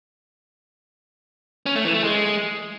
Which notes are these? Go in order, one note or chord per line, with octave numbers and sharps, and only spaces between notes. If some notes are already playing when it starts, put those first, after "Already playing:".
C#4
A3
E3
A3
G#3